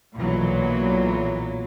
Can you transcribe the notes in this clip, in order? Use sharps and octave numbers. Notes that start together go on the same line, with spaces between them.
B1 A#2 E3 F#3